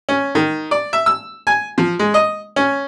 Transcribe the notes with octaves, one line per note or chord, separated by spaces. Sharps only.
C#4
D#3
D5
E5
E6
G#5
F3
G#3
D#5
C#4